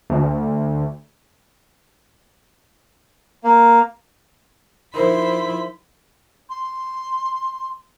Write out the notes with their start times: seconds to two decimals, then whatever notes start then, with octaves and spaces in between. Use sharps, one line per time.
0.10 D2
3.44 A#3
4.94 F3 D#4 E4 A#4 C5 B5 C6
6.50 C6